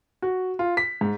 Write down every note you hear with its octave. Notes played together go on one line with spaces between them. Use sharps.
F#4
F4
B6
G#2